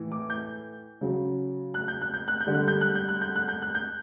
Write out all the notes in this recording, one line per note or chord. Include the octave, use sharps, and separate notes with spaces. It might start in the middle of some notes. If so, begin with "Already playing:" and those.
Already playing: A2 E3
D6
G6
C#3 F#3
F#6
G6
F#6
G6
F#6
G6
D3 G3
F#6
G6
F#6
G6
F#6
G6
F#6
G6
F#6
G6